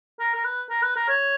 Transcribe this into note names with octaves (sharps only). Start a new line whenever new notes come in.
A#4
A#4
B4
A#4
B4
A#4
C#5